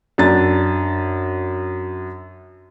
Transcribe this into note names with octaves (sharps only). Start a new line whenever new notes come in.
F#2 D4 A6